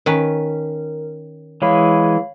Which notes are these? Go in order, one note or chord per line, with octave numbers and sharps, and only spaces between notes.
D#3 C#4 A#4 B4
E3 G#3 C#5 F5 B5